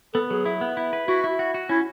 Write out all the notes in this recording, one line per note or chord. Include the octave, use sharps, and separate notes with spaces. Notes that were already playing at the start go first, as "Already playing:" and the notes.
B3 A4
F#3 G#4
E4
B3
E4
B4
E4 F#4
E4
F#4
F#4
C#4 E4